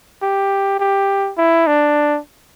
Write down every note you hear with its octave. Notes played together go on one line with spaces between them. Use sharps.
G4
G4
E4
D4